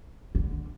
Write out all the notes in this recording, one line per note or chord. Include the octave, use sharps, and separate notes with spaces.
D3